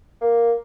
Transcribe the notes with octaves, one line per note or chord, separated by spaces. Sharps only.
A#3